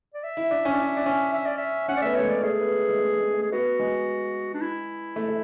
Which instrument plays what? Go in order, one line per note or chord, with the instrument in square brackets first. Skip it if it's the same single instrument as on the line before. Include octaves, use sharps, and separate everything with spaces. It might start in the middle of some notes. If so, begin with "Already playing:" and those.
[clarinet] D5
E5
[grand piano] E4
D4
C#4
D4
E4
D4
C#4
[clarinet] E5
D5
E5
[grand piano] C#4 [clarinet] F#5
[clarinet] D5
[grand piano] A3 B3 [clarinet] E5
[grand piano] A3 [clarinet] C#5
[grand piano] G#3 [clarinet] D5
[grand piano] A3 [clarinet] G#4
[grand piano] B3
B3
G#3
A3
G#3
A3
[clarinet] G#4
[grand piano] B3 [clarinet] F#4
[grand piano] G#3
[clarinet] D4
E4
[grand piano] A3
A3